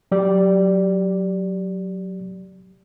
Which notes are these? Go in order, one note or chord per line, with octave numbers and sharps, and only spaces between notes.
F#3 G4 D5